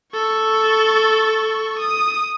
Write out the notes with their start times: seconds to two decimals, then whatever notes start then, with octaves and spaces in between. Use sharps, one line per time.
0.13 A4 C#6
1.79 D#6